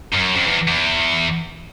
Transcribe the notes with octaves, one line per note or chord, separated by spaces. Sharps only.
F#2
F2
E2
E2